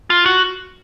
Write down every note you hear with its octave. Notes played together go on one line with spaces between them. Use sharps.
F4
F#4